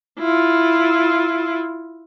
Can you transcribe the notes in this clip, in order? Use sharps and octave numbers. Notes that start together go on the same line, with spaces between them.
E4 F4